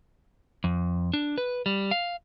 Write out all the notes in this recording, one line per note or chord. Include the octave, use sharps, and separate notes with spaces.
F2
D4
B4
G3
F5